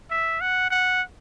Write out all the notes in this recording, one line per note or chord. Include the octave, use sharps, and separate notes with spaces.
E5
F#5
F#5